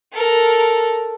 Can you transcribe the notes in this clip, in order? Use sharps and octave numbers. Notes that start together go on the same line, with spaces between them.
A4 A#4